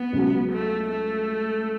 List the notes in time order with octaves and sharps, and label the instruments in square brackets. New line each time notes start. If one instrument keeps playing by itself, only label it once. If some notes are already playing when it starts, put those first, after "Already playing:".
Already playing: [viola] B3
[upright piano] C#2 C#3 F#3
[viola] A3
A3